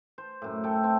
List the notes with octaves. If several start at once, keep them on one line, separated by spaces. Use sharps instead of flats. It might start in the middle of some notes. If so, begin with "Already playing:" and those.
C5
F#2 A2
A3 A4 G5
C4